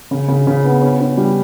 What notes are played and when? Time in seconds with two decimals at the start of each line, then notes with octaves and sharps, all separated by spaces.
0.11 C#3
0.28 C#3
0.47 C#3
0.64 B3
0.81 C#4
1.00 C#4
1.17 G3